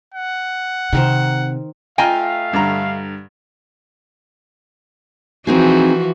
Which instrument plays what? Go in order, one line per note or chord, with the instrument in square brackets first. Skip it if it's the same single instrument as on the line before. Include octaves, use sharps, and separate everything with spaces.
[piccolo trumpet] F#5
[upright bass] C3 [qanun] D#3 A#4 C5
[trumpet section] A3 F5 [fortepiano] F4 A#5 [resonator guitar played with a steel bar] D#5 G5 G#5
[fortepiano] G2 D3 A#5
[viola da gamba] E3 F3 F#4 [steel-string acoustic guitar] C4 D#4 G#4